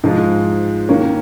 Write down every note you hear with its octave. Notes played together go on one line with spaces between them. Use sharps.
G#2 F3 G#3 F4
D#3 A#3 C#4